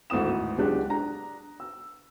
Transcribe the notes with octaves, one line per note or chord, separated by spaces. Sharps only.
G#1 D2 A2 D#6 E7
C#2 F#3 G#3 D4 G4 F#6
D4 A#5
E6